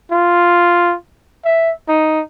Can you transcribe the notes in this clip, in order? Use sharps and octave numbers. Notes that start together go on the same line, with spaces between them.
F4
E5
D#4